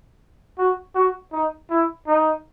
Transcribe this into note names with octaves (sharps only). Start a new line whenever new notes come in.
F#4
F#4
D#4
E4
D#4